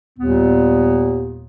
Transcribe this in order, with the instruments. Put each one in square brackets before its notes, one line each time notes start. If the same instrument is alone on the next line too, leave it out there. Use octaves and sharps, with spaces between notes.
[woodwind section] D#2 A#2 G3 B3